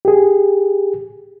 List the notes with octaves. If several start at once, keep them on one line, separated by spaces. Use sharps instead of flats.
G4 G#4